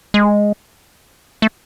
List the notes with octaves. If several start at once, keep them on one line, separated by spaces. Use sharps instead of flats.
G#3
A3